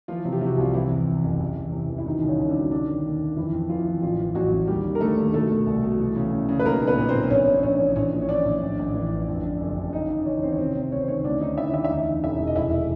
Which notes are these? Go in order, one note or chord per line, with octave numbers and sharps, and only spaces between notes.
E3 F3 F4
C3
G4
C3
F#4
C2 F4
C3 E3 E4
E2
E2
F#1
E3
E2
C3
E3
E4
B2 D#3 D#4
C2
C#3 C#4
C2
D3 D4
B2
D3 D#3 D4
D#3
D#2
D#2
F2 E3 E4
F2
E3 F3 F4
E3
A1 F3 F4
E3
A1 F#3 F#4
A1
D#2 G3 G4
D#2
A#4
D3 A3 A4
D#2
B2 A3 A4
B2
C2
B2
E3
C#3
C#3
C#3
B4
B1 A#3 A#4
B1
B3 B4
A#2
C4 C5
A#2
A#1 C#4 C#5
A#1
A#1 C#4 C#5
E3
A#1 C#4 C#5
A#2
C#5
A#1 D4 D5
A#1
A1
A1
E3
G2
F2
D3
F#1
D3
C#3 D#4 D#5
C#3 D#4 D#5
E3 C#4 C#5
D#2 C4 C5
C#5
C3 C4 C5
C3
C#2 C#5
C5
D#3 C#4 C#5
D2 D4 D5
D3 D#4 D#5
D2 E4 E5
D2 E4 E5
E5
E2 D#4 D#5
C#3
E1 E4 E5
E1
D#5
F1 E4 E5